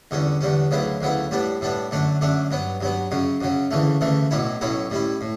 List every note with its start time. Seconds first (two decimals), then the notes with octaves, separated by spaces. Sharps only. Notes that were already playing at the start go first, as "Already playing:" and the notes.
0.11 E2 D3 G3 C#4
0.41 E2 D3 G3 C#4
0.71 D2 C#3 F#3 B3 E4
1.01 D2 C#3 F#3 B3 E4
1.31 A2 G3 B3 D4
1.61 A2 G3 B3 D4
1.91 F#2 D3 A3 D4
2.21 F#2 D3 A3 D4
2.51 G2 F#3 B3
2.81 G2 F#3 B3
3.11 F#2 C#3 F#3
3.41 F#2 C#3 F#3
3.71 D2 C#3 E3 A3
4.01 D2 C#3 E3 A3
4.31 B1 A2 F#3 C#4 E4
4.61 B1 A2 F#3 C#4 E4
4.91 A2 G3 C#4 E4
5.21 A2